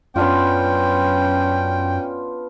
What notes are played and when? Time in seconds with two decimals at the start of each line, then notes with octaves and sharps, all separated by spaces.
0.16 F#2 B3 C#4 D4 F4 G5